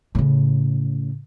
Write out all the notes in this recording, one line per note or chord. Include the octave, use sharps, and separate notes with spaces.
A2 C#3